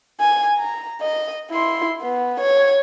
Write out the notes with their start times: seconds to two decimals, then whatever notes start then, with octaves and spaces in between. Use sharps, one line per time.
0.20 G#5
0.58 A#5
1.01 D#5
1.51 E4 C6
2.02 B3
2.40 C#5